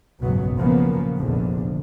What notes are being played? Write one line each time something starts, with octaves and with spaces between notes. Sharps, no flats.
F#1 B1 G#2 B2 F#3 B3
A#2 C#3 F3 A#3 B3
F1 A#1 E2 D3